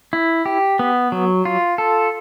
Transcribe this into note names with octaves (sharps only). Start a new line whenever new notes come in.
E4
G4
B3
F#3
F4
A4